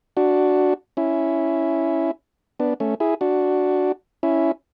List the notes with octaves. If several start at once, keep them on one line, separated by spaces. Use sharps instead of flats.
D4 F#4
C#4 E4
B3 D4
A3 C#4
E4 G#4
D4 F#4
C#4 E4